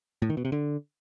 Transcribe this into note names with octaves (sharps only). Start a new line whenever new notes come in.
A2
D#3
B2
C3
D3